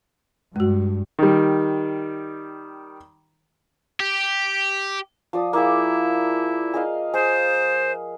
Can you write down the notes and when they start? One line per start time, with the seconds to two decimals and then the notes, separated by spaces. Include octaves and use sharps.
0.56 G2 G#3 F#4
1.19 D#3 G3
4.00 G4
5.33 F3 D5 D#6
5.53 A#3 E4 G#4
6.74 G#4 D#5 F5
7.14 G#4 C5